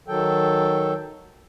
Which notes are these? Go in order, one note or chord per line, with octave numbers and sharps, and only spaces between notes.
D#3 F#3 A4 G5